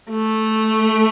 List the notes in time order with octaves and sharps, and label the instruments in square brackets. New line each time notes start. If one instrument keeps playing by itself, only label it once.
[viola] A3